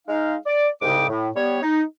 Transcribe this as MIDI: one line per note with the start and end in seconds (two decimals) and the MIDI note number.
0.08 0.35 56
0.08 0.35 63
0.08 0.35 77
0.46 0.68 74
0.82 1.08 36
0.82 1.08 44
0.82 1.08 49
0.82 1.08 67
0.82 1.08 79
0.82 1.08 86
1.09 1.29 45
1.36 1.62 55
1.36 1.62 59
1.36 1.62 73
1.63 1.83 63